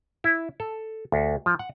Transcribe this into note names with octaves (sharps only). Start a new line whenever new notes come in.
E4
A4
D2
F3
F#5